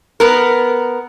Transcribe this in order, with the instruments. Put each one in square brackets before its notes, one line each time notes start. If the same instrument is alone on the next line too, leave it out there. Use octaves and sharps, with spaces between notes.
[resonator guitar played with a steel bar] B3 A#4